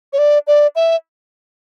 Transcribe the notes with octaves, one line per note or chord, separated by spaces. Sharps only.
C#5
D5
D5
E5